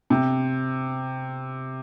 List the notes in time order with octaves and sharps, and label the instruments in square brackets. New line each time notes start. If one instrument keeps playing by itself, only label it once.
[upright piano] C3